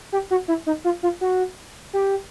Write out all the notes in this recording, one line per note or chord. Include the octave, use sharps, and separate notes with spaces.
G4
F#4
E4
D#4
F4
F4
F#4
G4